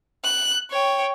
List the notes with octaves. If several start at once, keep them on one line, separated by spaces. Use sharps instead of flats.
F#6
C#5 G5